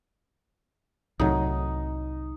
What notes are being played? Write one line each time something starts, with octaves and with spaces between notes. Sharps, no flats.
C2 A2 F#3 D#4